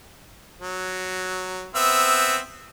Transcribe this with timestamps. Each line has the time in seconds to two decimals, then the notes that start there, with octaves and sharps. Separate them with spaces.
0.60 F#3
1.75 B3 C4 E5